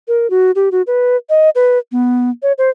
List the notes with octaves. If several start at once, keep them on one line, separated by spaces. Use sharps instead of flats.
A#4
F#4
G4
F#4
B4
D#5
B4
B3
C#5
C5